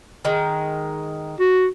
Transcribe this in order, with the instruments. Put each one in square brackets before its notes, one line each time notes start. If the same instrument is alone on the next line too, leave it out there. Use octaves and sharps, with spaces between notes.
[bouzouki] D#3 G#3
[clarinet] F#4